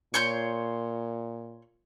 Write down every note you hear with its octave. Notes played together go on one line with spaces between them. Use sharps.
A#2 C#5 C6 G6